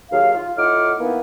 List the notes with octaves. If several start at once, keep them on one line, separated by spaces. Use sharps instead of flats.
D#2 F#3 G#4 F5
F4
A2 D#4 F4 F#5 D6 F6
E3 A#3 B3 D#4 E4